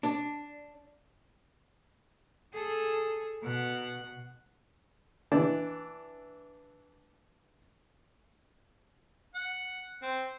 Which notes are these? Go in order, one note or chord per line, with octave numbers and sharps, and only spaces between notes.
D4
G#4 A4
B2 F#5
E3 D4
F#5
C4